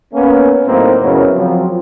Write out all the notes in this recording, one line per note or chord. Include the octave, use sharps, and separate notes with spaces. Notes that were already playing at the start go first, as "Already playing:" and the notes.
A#3 B3 C#4
A2 F#3 A3 A#3 C4 D#4
F#2 C#3 F#3 B3 E4 A#4
F3 F#3 C4